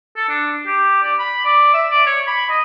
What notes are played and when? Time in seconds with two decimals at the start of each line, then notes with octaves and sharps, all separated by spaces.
0.17 A4
0.29 D4
0.67 G4
1.03 D5
1.19 B5
1.45 D5
1.73 E5
1.90 D5
2.07 C#5
2.28 B5
2.49 D#5